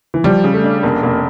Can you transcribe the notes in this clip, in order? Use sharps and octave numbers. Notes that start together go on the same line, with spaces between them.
E3
F3 G3
C#3
A3
D4
F1 A#3
F1 A#3